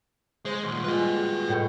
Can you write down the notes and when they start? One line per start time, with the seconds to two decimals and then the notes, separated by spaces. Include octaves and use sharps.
0.45 G#3 C5 C6
0.64 D#2 A#2
0.84 G3 G#3 F4 B4 D#5
1.49 A2 G5 C#6